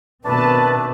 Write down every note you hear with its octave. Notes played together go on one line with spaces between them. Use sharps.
B2 D#3 A3 C4 D4 B4 A5